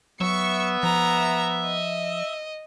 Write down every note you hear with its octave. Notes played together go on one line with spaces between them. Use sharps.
F#3 B3 E5 C#6 C#7
F3 A#5
D#5